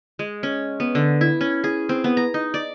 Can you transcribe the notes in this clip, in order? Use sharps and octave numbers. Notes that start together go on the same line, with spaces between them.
G#3
C#4
B3
D3
E4
C#4
G#4
C4
B3
A#5
D#4
D5